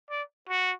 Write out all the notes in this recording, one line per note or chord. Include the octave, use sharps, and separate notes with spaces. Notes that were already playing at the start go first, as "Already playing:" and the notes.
D5
F#4